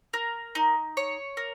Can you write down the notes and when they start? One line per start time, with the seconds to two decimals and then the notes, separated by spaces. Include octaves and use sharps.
0.13 A#4
0.55 D#4
0.97 C#5
1.37 A#4